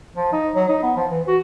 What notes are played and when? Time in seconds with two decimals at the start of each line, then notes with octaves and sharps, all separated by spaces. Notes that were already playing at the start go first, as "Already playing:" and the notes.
0.17 F3
0.32 D#4
0.55 F#3
0.69 D#4
0.83 B3
0.96 F3
1.10 E3
1.28 F#4